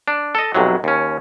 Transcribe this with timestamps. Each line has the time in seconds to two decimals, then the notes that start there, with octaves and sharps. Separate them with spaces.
0.08 D4
0.35 A4 D#5
0.55 B1 F2 C3 F#3
0.84 D#2 C#4